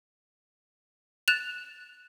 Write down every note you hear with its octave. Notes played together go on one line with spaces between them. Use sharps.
F#6 A6 E7 F7